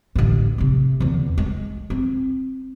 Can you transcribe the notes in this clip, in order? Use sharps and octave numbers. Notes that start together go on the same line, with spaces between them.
A1 D3
C3 A3
E2 D3
G#3
C4